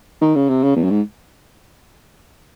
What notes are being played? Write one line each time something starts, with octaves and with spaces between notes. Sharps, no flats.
D#3
C#3
C3
C#3
E2
F#2
G#2